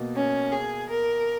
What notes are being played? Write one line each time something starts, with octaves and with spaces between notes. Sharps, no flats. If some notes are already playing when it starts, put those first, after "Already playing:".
Already playing: B2 A#3
C#4
G#4
A#4